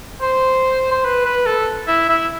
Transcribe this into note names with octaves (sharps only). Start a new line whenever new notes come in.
C5
C5
B4
B4
A4
E4
E4